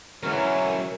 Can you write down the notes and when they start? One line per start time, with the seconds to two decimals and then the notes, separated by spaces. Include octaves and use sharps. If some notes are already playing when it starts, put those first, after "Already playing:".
0.23 E3 F#3 B3 C#4 E4 A#4